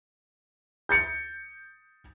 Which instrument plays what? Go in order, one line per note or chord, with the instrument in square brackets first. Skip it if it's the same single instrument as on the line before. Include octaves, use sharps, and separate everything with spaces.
[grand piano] G6 A6 C#7